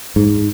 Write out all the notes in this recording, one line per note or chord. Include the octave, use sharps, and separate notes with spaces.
G#2